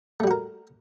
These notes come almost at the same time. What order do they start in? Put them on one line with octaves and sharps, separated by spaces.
A3 G3 F#4 A#4